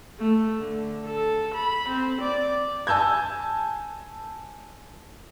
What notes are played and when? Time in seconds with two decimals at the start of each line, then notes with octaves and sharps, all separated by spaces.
0.19 A3
0.60 D3
1.05 A4
1.54 B5
1.89 C4
2.21 D5
2.87 G#5 A5 E6 G6 G#6